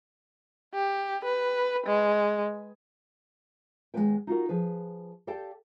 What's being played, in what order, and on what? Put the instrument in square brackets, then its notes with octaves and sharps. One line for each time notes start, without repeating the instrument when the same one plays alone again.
[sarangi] G4
B4
G#3
[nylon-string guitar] D#2 G#3 A#3 B3 B4 G5
D#4 F4 F#4 A#4
F3 G#4 B4
G4 A4 D5 F5 G5 A5